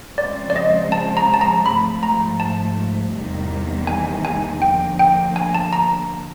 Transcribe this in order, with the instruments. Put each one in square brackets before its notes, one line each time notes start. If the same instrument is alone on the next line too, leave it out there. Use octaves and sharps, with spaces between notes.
[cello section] C#3 F3 G#3 C4 [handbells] D5
[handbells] D5
D#5
A5
A#5
A5
A#5
[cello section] G#2 F3 A3 [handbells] B5
[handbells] A#5
A5
[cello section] E2 C3 D#3 G3 A#3
[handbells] G#5
G#5
[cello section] D3 F3 A#3 [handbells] G5
[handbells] G5
G#5
A5
A#5